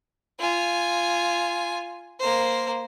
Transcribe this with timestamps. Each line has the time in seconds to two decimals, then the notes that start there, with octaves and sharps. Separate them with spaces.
0.40 F4 G#5
2.20 A#3 C5